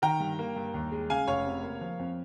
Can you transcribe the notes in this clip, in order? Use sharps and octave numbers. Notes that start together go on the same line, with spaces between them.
D#3 G5 A#5
G2
A#3
G2
D#2
G#3
C#3 F5 G#5
F1 C#5 F5
C3
A#3
F3
F2